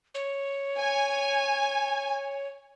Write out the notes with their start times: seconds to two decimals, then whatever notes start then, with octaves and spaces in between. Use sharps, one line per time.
0.15 C#5
0.78 G#5